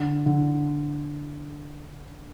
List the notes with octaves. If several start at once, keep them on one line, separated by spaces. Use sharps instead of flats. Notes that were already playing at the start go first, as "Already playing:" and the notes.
Already playing: D3
D3